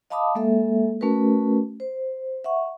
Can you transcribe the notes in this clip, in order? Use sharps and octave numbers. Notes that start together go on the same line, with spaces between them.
D#5 F5 A5 B5 D6 D#6
G#3 A#3 A4 E5
A3 C#4 F#4 A#4 B4
C5
E5 F#5 C#6